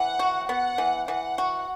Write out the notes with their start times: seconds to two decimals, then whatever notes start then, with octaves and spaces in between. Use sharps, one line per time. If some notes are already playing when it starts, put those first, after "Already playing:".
Already playing: E3 F#5
0.19 F#4
0.48 B3 F#5
0.78 E3
1.08 E3 F#5
1.38 F#4